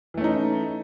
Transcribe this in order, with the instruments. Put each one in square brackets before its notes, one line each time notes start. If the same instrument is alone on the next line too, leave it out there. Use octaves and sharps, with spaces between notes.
[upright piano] E3
A3
C#4
D#4